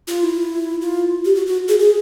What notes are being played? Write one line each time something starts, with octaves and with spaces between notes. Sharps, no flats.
F4
E4
F4
G4
F#4
F#4
G#4
G#4